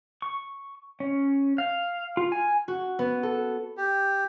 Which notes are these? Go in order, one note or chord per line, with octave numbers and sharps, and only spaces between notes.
C#6
C#4
F5
F4
G#5
F#4
B3
A4
G4